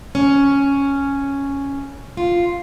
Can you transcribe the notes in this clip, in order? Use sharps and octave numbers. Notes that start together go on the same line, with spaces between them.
C#4
F4